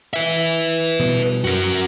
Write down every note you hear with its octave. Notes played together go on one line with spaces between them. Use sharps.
B4 E5
B2 F3 G3
F#2 F#4 A#4